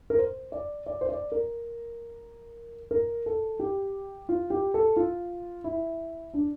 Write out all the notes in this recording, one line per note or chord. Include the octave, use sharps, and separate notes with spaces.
A#4
C5
D5
D5
C5
D5
A#4
A#4
A4
G4
F4
G4
A4
F4
E4
D4